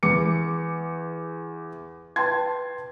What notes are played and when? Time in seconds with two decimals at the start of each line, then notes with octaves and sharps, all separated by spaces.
0.03 E2 D6 C#7
2.16 B4 G5 A5 C6 G#6